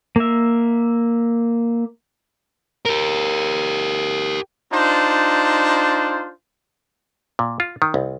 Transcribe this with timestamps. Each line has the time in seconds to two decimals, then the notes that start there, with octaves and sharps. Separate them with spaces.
0.16 A#3 E5
2.86 G4 A#4
4.72 D4 D#4 F4 C5
7.39 A#2
7.60 F4
7.82 D#3
7.94 C2